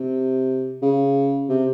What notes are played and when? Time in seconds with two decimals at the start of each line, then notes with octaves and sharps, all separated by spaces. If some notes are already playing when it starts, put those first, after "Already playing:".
Already playing: C3
0.82 C#3
1.49 C3